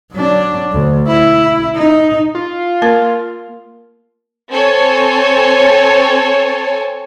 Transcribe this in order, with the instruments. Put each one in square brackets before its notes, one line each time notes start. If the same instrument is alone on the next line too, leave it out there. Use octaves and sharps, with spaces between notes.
[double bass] F#3 D4
D2
E4
D#4
[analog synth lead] F4
[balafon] A#3 A#4
[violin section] C4 A4 C#5 G#5